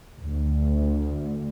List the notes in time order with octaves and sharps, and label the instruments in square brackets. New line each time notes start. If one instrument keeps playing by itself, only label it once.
[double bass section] D2